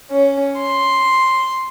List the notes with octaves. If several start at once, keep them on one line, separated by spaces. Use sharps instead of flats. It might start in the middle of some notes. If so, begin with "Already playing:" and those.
C#4
C6